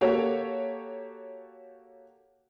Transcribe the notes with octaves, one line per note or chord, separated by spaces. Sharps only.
A#3 F#4 G4 A4 C#5